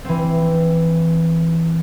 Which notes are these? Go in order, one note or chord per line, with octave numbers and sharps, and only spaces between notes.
E3 C4